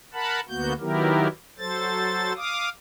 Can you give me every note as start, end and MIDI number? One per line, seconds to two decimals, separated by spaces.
0.14 0.40 70
0.14 0.40 78
0.14 0.40 81
0.14 0.40 83
0.49 0.73 38
0.49 0.73 58
0.49 0.73 59
0.49 0.73 66
0.49 0.73 91
0.80 1.28 51
0.80 1.28 54
0.80 1.28 59
0.80 1.28 64
0.80 1.28 67
0.80 1.28 70
1.58 2.33 54
1.58 2.33 69
1.58 2.33 72
1.58 2.33 93
2.36 2.69 77
2.36 2.69 86
2.36 2.69 87